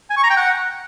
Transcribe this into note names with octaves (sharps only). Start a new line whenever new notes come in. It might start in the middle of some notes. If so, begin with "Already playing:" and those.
G#5
C#6
A#5
G5
F#5